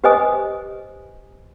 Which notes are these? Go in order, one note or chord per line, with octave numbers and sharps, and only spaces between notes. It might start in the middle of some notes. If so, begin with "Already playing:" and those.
G4 B4 C5 D#5 G#5 D#6